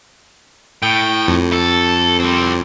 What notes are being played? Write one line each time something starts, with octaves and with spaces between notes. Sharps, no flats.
A2 G5
F2
A4
G3 C4